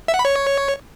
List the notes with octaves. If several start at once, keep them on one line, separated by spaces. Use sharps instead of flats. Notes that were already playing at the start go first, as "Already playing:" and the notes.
E5
F#5
B5
C#5